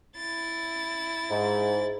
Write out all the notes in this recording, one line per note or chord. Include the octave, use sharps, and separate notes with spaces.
E4 A6
G#2